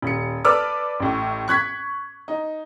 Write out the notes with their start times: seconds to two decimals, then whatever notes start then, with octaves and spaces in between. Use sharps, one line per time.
0.02 D#1 C#7
0.45 A4 B4 D5 D6 E6 F6
1.00 A1 A2
1.48 C#6 F#6 G#6 B6
2.28 D#4